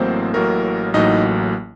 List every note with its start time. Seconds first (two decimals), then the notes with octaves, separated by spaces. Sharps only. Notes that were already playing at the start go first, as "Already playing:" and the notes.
Already playing: A1 A2 F#3 A#3 C4 C5
0.34 A1 A2 F#3 A#3 A#4
0.94 A1 A2 F#3 A#3 D#4 D#5